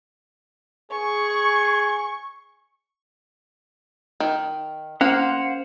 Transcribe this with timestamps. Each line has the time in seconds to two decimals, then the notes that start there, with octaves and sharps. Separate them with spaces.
0.92 G#4 C#6
4.20 D#3
5.01 A#3 C#4 C5 F5 F#5